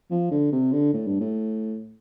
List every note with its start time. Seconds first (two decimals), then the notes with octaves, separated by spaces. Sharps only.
0.11 F3
0.31 D3
0.52 C3
0.72 D3
0.93 A2
1.07 G2
1.20 A2